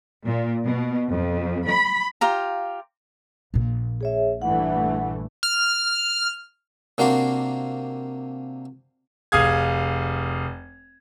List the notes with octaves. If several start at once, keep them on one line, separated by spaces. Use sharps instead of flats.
A#2
B2
F2
B5
F4 G4 F5 A#5
A#1 A#2
G#4 C#5 E5
G2 E3 A3 F#5
F6
C3 A#3 D4 F#4 G5 C6
F1 G#4 F5 D#6 F6 G#6